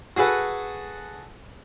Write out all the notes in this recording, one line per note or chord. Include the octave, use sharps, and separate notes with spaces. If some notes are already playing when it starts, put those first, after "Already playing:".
F#4 G#4 A4 B4 F#5